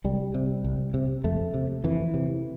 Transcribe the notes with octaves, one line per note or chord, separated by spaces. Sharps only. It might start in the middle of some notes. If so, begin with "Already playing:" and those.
C2 G3
C3
C2
C3
F2 A3
C3
F2 E3
C3